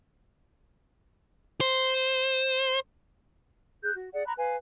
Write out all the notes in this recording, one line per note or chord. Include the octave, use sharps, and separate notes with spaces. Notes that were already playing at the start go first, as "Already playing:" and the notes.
C5
G#4 F#6 G6
F#4
G#4 D5 F#5
A#5 B5 C#6 F#6
B4 F5 G#5